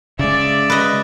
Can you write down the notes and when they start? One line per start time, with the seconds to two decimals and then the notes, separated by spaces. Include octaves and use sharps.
0.19 C#3 G#3 D5 E5
0.70 B4 D#5